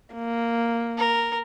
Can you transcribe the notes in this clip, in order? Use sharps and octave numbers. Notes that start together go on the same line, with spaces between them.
A#3
A#4